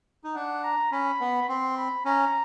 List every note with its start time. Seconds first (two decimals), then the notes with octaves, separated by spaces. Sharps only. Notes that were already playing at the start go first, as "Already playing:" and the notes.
0.24 D#4
0.35 D4 F#5
0.64 A#5
0.92 C#4 B5
1.20 B3
1.49 C4 C6
1.77 B5
2.05 C#4 A#5